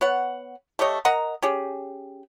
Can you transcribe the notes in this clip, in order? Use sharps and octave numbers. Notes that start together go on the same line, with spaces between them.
B3 C#5 F#5
A3 G4 C#5 D#5
A#4 D#5 F#5 A#5
C#4 G4 G#4